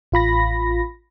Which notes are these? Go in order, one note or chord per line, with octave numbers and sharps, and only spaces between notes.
A1 F4 B5 A#6